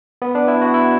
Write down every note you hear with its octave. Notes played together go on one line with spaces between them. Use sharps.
B3
D4
E4
F#4
E4